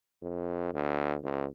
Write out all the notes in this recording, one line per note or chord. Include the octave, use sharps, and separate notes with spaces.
F2
D2
C#2